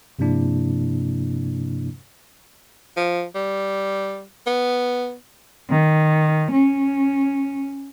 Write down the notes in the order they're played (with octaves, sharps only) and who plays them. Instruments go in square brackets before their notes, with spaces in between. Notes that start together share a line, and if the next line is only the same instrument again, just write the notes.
[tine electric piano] G2 C3 F3 A#3 D4 E4
[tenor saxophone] F3
G3
B3
[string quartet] D#3
C#4